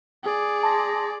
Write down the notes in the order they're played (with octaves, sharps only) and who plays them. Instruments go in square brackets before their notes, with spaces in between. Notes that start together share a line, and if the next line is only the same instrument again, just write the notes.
[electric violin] G#4 D5
[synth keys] A5 C6 A#6